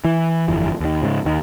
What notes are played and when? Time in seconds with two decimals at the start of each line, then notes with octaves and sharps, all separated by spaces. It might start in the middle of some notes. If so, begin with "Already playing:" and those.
0.05 E3
0.48 G1 F2 E3
0.80 D#2 D#3
1.03 G#2 C#3
1.25 D#2 D#3